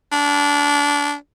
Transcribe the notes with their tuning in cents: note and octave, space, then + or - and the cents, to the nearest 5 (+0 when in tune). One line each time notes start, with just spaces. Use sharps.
D4 -20